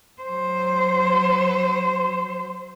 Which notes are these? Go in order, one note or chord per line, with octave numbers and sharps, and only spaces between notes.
F#3 C5